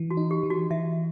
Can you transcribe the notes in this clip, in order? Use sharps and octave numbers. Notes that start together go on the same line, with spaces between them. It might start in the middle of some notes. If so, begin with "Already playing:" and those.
Already playing: E3
F#4
D#4
G4
E3
F#4
E3 E5